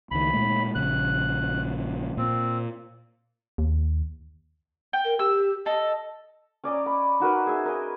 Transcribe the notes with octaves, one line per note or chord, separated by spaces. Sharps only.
C#2 D#3 B5
A#2 G#3 A3
A#1 C#3 F#6
A#2 C4
D#2
G5
A#4
G4 E6
A4 D#5
C#4 D5 D#5 A#5
B5
D#4 F#4 A#4 B4
G#4 E5
A#4 B4 D#5 G#5